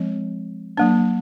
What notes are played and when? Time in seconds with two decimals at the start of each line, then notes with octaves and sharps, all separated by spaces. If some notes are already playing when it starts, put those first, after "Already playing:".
Already playing: F3 G#3 C4
0.77 F#3 A#3 D4